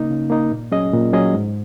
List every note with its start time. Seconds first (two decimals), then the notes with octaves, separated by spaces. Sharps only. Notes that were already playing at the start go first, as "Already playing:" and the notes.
Already playing: C#3 A#3 D#4
0.10 C#3
0.30 A#3 D#4
0.51 A#2
0.71 F#3 C#4 G#4 D#5
0.93 A#2
1.13 F#3 C#4 G#4 D#5
1.34 G#2